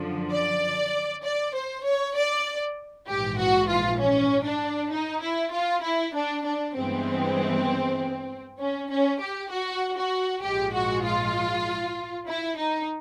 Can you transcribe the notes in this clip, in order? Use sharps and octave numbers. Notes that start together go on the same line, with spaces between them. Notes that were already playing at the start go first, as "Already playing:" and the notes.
Already playing: F#2 D3 F3
D5
D5
C5
C#5
D5
A#1 G#2 E3 G4
F#4
F4
C#4
D4
D#4
E4
F4
E4
D4
D4
G2 E3 G#3 B3 C4
C#4
C#4
G4
F#4
F#4
A#1 G#2 F3 G#3 G4
F#4
F4
E4
D#4